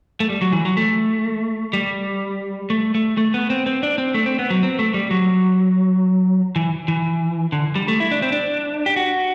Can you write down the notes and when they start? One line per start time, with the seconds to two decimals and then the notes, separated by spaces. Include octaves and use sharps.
0.20 A3
0.29 G3
0.41 F#3
0.52 E3
0.65 F#3
0.77 A3
1.73 G3
2.70 A3
2.95 A3
3.17 A3
3.34 B3
3.50 C4
3.66 C4
3.83 D4
3.98 C4
4.14 A3
4.26 C4
4.39 B3
4.50 F#3
4.63 C4
4.79 A3
4.94 G3
5.11 F#3
6.56 E3
6.88 E3
7.52 D3
7.75 G3
7.88 A3
8.00 E4
8.11 D4
8.22 C4
8.32 D4
8.86 G4
8.96 F#4